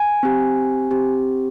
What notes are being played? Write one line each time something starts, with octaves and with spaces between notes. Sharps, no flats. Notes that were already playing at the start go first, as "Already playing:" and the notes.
Already playing: G#5
C4 G4
C4 G4